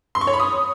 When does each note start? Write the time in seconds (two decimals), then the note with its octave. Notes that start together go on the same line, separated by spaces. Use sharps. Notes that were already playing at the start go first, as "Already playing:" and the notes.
0.15 C6
0.21 C#6
0.27 C#5
0.34 B5
0.40 D#6